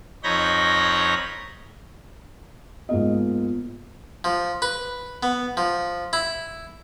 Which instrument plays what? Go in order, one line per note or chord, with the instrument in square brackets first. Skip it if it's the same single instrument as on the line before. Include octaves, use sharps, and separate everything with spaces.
[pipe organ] F2 D#4 C#5 B5 G6 A#6
[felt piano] G#2 A#3 D#5 [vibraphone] B3 F4
[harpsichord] F3
B4
B3
F3
E4